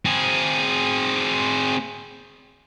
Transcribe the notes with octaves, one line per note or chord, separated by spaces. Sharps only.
C4 G#4